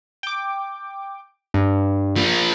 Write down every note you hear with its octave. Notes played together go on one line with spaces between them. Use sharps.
G5 D6
G2
F3 A#3